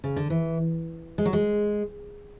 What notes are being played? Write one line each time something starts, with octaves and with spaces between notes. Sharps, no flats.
C#3
D3
E3
G#3
F#3
G#3